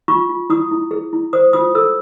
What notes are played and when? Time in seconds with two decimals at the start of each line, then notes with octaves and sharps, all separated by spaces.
0.08 F4 C#6
0.29 F4
0.50 E4 D#6
0.71 E4
0.91 G#4
1.13 E4
1.33 C5 D#6
1.53 F4 D#6
1.75 A4 E6